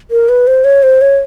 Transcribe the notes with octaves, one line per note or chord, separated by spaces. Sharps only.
A#4
B4
C5
C#5
C5
C#5